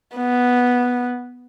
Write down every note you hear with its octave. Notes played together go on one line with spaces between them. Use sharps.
B3